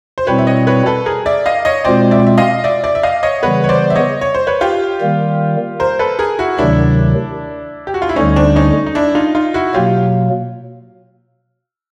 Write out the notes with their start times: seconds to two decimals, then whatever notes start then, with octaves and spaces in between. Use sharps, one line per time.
0.18 C5
0.27 B2 G3 C4 E4 B4 C#5
0.38 E5
0.47 C#5 D#5
0.67 B4 C#5
0.86 A4 B4
1.06 G#4 A#4
1.26 D5 E5
1.46 D#5 F5
1.65 C#5 D#5
1.85 B2 G#3 C4 F4 C5 D5
2.11 D5 E5
2.27 E5
2.38 D#5 F5
2.64 D5 E5
2.84 D5 E5
2.95 E5
3.03 D#5 F5
3.23 C#5 D#5
3.42 C#3 E3 G3 B3 B4 C#5
3.64 C#5
3.69 C5 D5
3.90 E5
3.95 C#5 D#5
4.21 C#5
4.35 C5
4.47 B4 C#5
4.61 F4 G4
5.01 D#3 G3 A#3
5.80 A#4 C5
5.99 A4 B4
6.19 G#4 A#4
6.39 E4 F#4
6.58 D2 C3 D#3 F#3 D4 E4
7.87 G4
7.94 F#4
8.02 F4
8.09 E4
8.16 D2 D3 G3 C#4 D#4
8.36 C4 D4
8.56 C#4 D#4
8.86 D#4
8.95 D4 E4
9.15 D#4 F4
9.35 D#4 F4
9.54 E4 F#4
9.74 B2 F#3 A#3 F4 G4